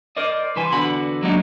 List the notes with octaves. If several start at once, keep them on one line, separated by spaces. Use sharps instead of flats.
A#4 C5 D5 D#5
C2 E3 B4 C5 G#5
E2 D3 F#4 B4 F#5 B5
F#3 G#3 A#3 D4 D#4 F#4